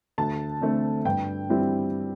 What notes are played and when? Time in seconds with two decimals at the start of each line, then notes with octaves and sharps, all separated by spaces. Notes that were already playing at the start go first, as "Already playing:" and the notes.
0.18 D2 A5
0.61 D3 A3 C4
1.05 G2 G5
1.50 G3 C4 E4